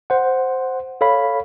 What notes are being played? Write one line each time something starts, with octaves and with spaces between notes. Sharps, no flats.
C5 F#5
A4 C#5 F5 B5